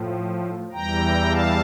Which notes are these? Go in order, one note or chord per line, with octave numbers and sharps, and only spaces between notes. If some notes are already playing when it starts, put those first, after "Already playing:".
Already playing: A2 F3
E2 E3 G3 G5 A#5
F5 A5